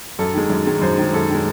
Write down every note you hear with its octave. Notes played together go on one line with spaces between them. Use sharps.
F#2 A4
D#3 G#3
F#2
D#3 G#3
F#2 C5
D#3 G#3
F#2 A4
D#3 G#3